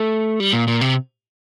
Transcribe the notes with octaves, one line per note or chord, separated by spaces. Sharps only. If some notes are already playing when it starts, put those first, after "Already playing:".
Already playing: A3
G3
A#2
A#2
C3